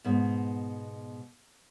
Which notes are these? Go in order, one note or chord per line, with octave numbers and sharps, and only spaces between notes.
G#2 B2